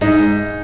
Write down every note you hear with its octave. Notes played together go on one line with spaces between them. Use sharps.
G#2 D#4